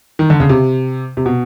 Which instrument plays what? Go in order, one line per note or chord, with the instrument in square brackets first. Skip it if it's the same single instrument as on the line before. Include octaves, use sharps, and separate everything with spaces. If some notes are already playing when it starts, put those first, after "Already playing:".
[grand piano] D#3
D3
C#3
C3
C3
B2